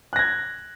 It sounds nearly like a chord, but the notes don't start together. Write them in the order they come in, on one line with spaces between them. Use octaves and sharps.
F#6 A#6 G#6